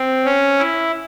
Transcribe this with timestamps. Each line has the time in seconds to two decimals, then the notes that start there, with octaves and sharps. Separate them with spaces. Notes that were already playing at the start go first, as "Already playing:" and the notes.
Already playing: C4
0.25 C#4
0.59 E4